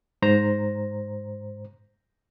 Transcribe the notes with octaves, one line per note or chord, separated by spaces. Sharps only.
G#2 C5 A#5